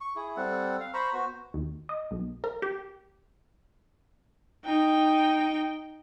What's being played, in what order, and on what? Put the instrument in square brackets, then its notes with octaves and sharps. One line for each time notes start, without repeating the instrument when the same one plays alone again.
[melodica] C#6
E4 G#4
G3 C4 A4 F#5
F5
C5 A#5 B5 C#6
B3 F#4 C5
[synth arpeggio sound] D#2
D#5
B1
A#4
G4
[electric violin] D#4 G5